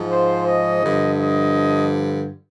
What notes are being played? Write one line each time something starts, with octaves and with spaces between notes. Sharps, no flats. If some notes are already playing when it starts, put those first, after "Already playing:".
Already playing: G#2 F3
C5
D#5
G2 D3 F3
D#5